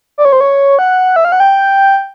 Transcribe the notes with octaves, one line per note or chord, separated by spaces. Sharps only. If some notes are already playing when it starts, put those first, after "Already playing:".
D5
C#5
C5
C#5
F#5
E5
F5
F#5
G5